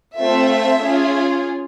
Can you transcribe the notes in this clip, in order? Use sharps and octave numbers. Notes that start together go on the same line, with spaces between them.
A3 C4 F4 A4 E5
C#4 F4 G#4